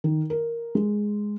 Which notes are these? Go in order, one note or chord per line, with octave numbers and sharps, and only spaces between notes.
D#3
A#4
G#3